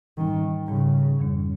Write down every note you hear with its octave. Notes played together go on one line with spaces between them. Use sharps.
G#2 D#3 G3 C#4
G#2 C#3 G3 C#4
F2 D#3 G3 C#4